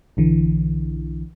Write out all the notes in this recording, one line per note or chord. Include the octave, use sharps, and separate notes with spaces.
B1 D3 E3